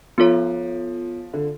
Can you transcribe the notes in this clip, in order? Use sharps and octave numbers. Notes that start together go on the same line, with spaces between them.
F3 B3 F4 A4 C#5
D3